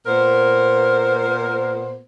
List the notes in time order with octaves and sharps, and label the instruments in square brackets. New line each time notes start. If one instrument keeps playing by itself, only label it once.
[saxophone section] A#2 B3 A#4 C5